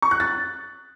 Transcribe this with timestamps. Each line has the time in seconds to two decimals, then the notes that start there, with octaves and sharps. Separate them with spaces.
0.02 C#6
0.11 F#6
0.20 A6